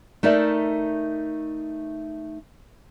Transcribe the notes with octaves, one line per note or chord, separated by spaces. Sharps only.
A3 D#4 A#4 D5 E5